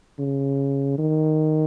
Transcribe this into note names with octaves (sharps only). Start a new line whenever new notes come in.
C#3
D#3